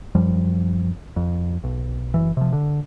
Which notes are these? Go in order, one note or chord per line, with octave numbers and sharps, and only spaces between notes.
F#2 F3 G3
F2
B1
F#1 E3
C3 F3
D3